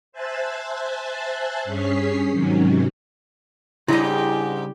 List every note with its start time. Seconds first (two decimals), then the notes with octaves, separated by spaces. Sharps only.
0.12 C5 E5 G#5 A5 F#6 A6
1.64 G2 C#4 G#4 C#5 B6 C7
2.30 G#2 C3 D#3 F#3 C#4
3.88 G#2 C#3 G3 D4 E4 G4 D#5 G5